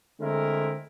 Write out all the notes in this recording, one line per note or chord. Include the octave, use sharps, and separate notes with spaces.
D3 G#3 A3 C4 E4 A#4